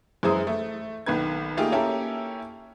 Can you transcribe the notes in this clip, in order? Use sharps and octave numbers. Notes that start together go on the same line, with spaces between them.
F#2 E3 G#3 E4 C5 D#6
A3
B1 D#3 B4 G#6
A3 A#3 D#4 F4 G4 G#4
A#3 C#4 E4 G4 A4